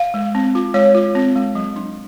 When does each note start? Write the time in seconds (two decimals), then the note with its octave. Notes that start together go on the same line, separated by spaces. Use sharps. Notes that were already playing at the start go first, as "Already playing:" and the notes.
Already playing: F5
0.14 G#3
0.35 C4
0.55 F4
0.74 G#3 C#5
0.95 F4
1.15 C4
1.35 G#3
1.55 F#3
1.76 D4